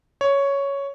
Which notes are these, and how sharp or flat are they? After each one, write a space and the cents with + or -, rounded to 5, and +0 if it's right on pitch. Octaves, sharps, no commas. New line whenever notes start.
C#5 +5